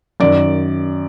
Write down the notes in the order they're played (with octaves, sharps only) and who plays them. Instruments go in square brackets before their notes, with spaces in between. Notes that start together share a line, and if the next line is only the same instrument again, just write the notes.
[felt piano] F#2 D#3 D5